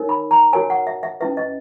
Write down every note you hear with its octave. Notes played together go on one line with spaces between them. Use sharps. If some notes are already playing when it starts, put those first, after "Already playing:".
Already playing: D#4 A#4 C#5
B5
A#5
F#4 A#4 C#5 G#5
F#5
E5
E5
C#4 E4 B4 E5
D#5